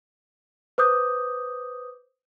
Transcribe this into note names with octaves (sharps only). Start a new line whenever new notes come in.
B4 C5 D6 D#6 G6